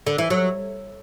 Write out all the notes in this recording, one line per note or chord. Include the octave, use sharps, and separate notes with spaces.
D3
E3
F#3